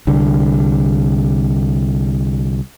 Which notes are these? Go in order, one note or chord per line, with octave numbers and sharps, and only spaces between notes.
C2 D3